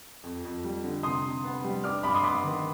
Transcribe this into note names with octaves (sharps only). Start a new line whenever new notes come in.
F2
F2
G3
D3
C3 C6 D#6
C3
B3
G3
D4 D6 F6
G2 B5 D6
C6 D#6
B3 B5 D6
D#3